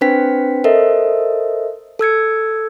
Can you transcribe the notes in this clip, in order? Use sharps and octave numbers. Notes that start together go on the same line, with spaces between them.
C4 D4 B4 C5 G5 B6
A4 A#4 C5 D#5 E5
A4 E6 G#6 C#7